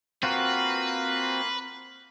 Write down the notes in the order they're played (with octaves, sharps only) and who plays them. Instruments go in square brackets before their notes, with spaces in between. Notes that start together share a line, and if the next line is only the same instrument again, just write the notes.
[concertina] A#3 C6 [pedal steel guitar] C4 F4 F#4 [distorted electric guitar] B4